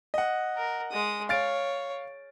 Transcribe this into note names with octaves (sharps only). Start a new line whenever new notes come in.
D#5 F#5
A#4
G#3 D#6
C#5 F5 A6 D7